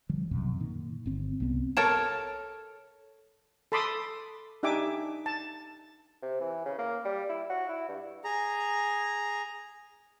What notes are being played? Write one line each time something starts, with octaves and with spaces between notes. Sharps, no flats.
D#3 F3 G3
B1 F#2 C3
A#2 D#3
G1 C4
C2 C3 B3 C4
A4 A#4 C#5 A5
A4 A5 B5 C6 D6 D#6
D4 D#4 G4 E5 G#5 D6
A5
C3
E3
C#3
A#3
G3
E4
F#4
E4
G2
G#4 A#5